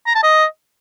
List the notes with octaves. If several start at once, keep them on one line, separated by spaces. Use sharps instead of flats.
A#5
A5
D#5